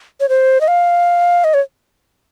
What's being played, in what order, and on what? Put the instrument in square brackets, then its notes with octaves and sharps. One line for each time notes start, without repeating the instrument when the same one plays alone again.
[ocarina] C#5
C5
D#5
F5
D#5
C#5